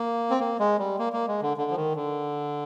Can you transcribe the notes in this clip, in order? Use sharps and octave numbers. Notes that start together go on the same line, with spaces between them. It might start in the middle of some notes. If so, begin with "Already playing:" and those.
Already playing: A#3
C4
A#3
G#3
G3
A#3
A#3
G#3
D3
D3
F3
D#3
D3